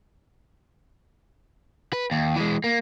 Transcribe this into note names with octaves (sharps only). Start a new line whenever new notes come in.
B4
D#2
E3 G#3
A#3